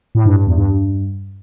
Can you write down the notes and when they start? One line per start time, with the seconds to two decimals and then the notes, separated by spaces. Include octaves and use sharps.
0.15 A2
0.25 G2
0.36 G2
0.47 E2
0.57 G2